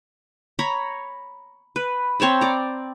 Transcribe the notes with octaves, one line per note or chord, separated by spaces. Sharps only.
C#5 A#5 B5
B4
C4 C#5 A5 B5
D5 A#5